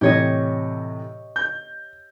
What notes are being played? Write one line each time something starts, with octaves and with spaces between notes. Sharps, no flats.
A2 C3 E3 G4 C#5 D#5
G6